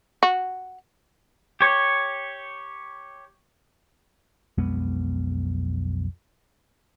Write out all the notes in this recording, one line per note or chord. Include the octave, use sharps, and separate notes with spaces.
F#4
G4 C#5
B1 F2 G#3 B3